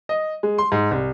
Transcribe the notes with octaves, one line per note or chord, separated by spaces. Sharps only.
D#5
G#3
C6
G#2
C2